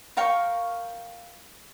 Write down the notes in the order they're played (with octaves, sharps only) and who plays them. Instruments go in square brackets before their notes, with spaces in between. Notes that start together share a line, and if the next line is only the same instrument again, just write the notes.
[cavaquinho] A#4 F5 G5 C#6